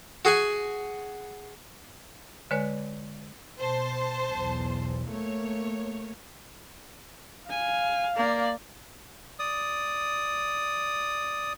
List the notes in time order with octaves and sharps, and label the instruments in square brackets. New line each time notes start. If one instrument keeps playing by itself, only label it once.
[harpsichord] F#4 G#4 F#5 G#5
[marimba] D3 G#3 B4 C#5 F#6
[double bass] B2 [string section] C5 A5
[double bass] B1 E2
[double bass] A3 A#3 [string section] C#5
[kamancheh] F5 [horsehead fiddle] G#5
[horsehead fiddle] A#3 D5
[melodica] D5 D#6